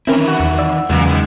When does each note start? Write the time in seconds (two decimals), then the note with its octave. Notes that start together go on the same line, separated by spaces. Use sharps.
0.07 D#3 E3 C4 C#4 E4 A#4
0.27 F#4
0.40 E2
0.59 D5 E6
0.90 E2 A#2 C#3 E3 F#3 G#3
1.07 D#3 E4